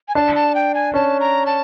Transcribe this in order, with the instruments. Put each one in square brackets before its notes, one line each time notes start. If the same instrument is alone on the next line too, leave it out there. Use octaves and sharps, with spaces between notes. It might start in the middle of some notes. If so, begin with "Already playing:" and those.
[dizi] G#5
[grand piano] D4 [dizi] A5
[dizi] A5
G5
G#5
[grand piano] C#4 [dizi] A5
[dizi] A#5
A5